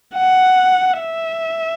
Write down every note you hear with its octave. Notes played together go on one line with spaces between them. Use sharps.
F#5
E5